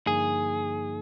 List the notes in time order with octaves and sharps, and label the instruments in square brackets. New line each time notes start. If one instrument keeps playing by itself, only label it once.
[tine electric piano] G2 D3 F3 A#3 D#4 [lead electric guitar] G#4